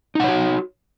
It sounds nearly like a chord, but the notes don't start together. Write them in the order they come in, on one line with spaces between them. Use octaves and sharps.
D#4 F#5 C#5 F#4